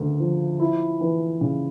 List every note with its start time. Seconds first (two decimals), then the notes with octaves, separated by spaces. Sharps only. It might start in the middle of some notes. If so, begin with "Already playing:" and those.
Already playing: D2 C#3
0.20 F3
0.59 E4
1.01 E3
1.41 C#3